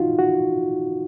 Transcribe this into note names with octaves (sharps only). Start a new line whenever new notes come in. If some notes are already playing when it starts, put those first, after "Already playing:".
Already playing: D#4 F4 F#4
F#4